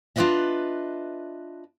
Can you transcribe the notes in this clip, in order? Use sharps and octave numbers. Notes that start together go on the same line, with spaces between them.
D4 F4 G#4 B4 D#5 E5